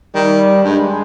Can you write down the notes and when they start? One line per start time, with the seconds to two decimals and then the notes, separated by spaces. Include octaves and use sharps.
0.15 D#3 G3
0.64 G2 G#3